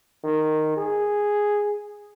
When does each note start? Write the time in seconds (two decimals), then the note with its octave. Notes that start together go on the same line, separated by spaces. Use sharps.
0.24 D#3
0.77 G#4